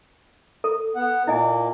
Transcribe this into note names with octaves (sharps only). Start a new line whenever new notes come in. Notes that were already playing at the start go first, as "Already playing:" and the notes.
A4
B3 F#5
A#2 A#3 E4 D#5 G#5